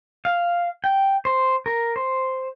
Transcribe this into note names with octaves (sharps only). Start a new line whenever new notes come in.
F5
G5
C5
A#4
C5